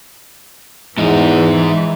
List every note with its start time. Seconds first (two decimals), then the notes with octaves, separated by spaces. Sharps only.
0.98 E2 G#2 E3 D#4